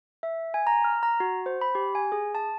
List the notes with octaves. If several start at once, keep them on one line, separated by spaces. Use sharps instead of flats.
E5
G#5
A#5
F6
A#5
F#4
C5
B5
G4
G#5
G#4
A5